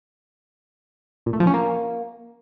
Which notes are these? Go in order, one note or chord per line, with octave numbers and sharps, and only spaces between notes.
A#2
A3
F3
C#4
A#3